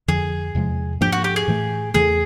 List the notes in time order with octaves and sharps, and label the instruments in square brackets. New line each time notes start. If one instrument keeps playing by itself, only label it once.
[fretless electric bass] F2 D3 F3 [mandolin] G#4
[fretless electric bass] E2 C3 F3 G#3
[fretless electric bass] G#2 F3 A#3 D4 [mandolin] G4
[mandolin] F#4
G4
G#4
[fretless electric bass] A2 E3 A3
[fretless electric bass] E2 C#3 E3 A3 [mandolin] G#4